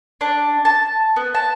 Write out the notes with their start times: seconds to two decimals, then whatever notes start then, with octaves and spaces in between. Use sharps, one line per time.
0.21 D4
0.65 A5
1.16 B3
1.34 A5